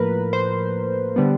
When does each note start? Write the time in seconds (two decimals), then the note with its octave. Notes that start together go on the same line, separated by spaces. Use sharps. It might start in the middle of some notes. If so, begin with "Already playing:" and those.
Already playing: A2 F3 A#3 A#4 B4
0.33 C5
1.16 D3 G3 B3